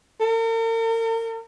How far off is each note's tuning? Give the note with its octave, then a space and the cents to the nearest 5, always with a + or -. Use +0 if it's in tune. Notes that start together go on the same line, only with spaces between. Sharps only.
A#4 -45